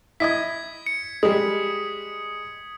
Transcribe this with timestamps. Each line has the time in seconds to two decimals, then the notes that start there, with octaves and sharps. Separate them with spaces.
0.20 E4 D#5 D#6 G#6 B6
0.86 C#7
1.23 G3 G#3 D#6